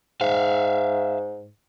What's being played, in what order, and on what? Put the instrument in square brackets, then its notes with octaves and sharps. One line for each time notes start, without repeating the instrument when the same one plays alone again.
[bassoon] G#2 [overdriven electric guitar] E5 F5